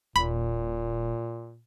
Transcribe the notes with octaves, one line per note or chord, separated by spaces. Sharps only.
D#1 A#2 B5